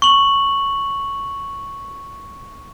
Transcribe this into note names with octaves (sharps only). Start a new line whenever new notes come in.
C#6 F#7